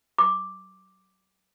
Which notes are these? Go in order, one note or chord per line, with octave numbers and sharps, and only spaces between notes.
D6